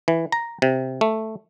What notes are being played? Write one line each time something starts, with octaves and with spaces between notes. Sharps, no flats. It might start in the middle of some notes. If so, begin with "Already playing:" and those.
E3
A#5
C3
A3